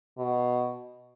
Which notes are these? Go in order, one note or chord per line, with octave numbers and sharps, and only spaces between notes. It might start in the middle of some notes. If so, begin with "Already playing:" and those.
B2